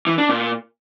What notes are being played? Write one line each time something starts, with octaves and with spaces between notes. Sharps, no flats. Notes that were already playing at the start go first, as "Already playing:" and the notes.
E3
D4
A#2